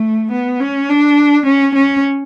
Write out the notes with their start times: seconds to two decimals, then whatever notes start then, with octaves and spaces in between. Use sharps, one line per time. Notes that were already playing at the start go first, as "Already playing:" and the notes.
Already playing: A3
0.32 B3
0.60 C#4
0.89 D4
1.46 C#4
1.75 C#4